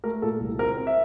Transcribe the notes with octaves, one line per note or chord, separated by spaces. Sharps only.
A3 A#4
A#2 A4
C2
C4 A#4
C4
E5